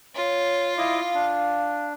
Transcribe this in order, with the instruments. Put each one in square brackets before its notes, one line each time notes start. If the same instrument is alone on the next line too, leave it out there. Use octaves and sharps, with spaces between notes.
[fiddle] F4 [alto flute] C#5
[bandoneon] E4 D#5 D6 [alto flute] F5
[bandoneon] D4